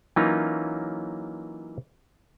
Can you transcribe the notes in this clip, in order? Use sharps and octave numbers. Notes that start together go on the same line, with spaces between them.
E3 F#3 A#3 C#4 D#4 F4